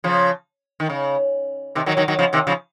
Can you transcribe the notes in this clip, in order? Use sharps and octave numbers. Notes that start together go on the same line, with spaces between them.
C#3 F3
D#3
C#3
C3 D#3
D#3 F#3
D#3 F#3
D#3 F#3
C#3 F3
C3 D#3
C#3 F3